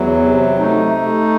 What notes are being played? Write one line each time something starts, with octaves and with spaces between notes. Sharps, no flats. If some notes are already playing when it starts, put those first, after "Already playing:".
Already playing: E2 F#3
C3
A3 D#4
A3